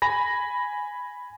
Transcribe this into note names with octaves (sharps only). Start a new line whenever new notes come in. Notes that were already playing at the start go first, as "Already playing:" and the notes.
G#5 B5 A#6